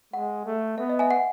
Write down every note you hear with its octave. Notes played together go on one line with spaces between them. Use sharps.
G#3 F#5
A3
B3 E5
D#5
E5 G#5
F#5